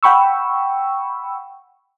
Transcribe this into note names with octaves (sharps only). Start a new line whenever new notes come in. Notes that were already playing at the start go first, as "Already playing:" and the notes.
F#5 G5 B5 C#6 E6